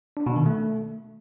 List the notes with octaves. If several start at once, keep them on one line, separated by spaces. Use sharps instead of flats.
D4
B2
D#3
A3